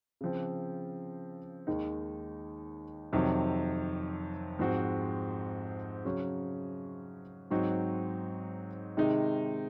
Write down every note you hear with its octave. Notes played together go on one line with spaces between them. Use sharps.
C#3 F3 C4
D#2 D#3 G#3 D#4
F2 C3 D#3 F#3
G#2 F3 G#3 C4 F#4
C#3 F#3 C#4 F#4
G#2 F#3 C4 D#4 F#4
C3 D#3 G#3 D#4